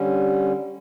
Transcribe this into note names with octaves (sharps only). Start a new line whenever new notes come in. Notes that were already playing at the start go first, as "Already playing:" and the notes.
Already playing: D3 G3 C#4